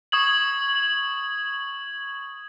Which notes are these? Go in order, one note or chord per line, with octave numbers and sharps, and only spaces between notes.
C#6 D#6 G#6 F#7